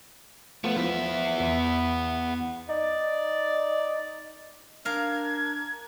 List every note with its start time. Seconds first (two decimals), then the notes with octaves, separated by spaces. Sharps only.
0.64 F3 A3 B3 F4
0.77 F3 B3 E4 E5
1.40 E2
2.69 D#4 D5
4.85 D4 A#4 F5 G#6